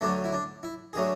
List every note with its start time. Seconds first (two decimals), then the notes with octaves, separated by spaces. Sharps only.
0.01 D2 D3 F#3 A3 D4
0.24 E4
0.32 D4
0.63 E4
0.93 D3 F#3 A3 G#4